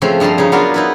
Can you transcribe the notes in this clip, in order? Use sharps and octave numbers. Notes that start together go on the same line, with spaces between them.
C#3 F3 A3 C4
G2 F3 A5 A#5 C6
C#3 D#4
F#3 B3 D4 F4 A#4 B4
D#4 E4 B4